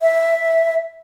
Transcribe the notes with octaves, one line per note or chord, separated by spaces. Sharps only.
E5